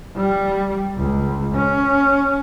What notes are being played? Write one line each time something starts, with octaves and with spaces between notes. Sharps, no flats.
G3
C#2
C#4